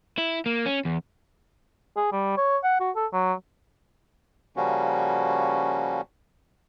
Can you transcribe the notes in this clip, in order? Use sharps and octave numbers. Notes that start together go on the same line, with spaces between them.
E4
A#3
C#4
E2
G#4
G3
C#5
F#5
F#4
A4
F#3
C#3 F3 G3 A#3 C#4 F#4